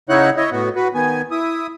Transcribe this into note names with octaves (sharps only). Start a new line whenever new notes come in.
C#3 D#4 E4 C#5 F#5 F#6
E4 C#5 D#5
A2 B3 F#4
F#4 B4
D#3 B3 G#5
E4 D#6